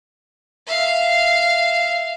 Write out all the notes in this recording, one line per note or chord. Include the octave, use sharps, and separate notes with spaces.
E5 F5